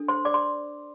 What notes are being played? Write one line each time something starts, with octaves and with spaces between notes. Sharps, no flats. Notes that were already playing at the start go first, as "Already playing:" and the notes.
Already playing: D4 A4
C5 C6
D5 D6
C6